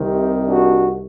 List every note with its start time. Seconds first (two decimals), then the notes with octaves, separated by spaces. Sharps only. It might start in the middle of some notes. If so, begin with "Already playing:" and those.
Already playing: C2 C3 D#3
0.48 D4 F#4